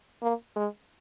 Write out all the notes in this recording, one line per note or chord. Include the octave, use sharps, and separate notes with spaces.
A#3
G#3